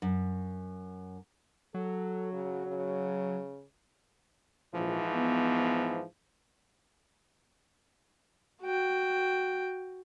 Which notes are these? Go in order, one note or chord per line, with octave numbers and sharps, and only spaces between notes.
F#2
F#3 A4
C#3
C#3
A#1 G#2 E3 F3
B3
F#4 G5